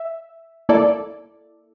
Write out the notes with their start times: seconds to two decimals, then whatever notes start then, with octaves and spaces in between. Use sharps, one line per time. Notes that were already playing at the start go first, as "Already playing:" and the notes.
Already playing: E5
0.69 A#3 E4 A4 D5